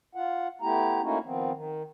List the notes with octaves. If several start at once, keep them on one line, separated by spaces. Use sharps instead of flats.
F4 F#5
A3 B3 E4 G4 A#5
A3 A#3 C#4 D#4 E4 F#4
D#3 F3 B3 C4
D#3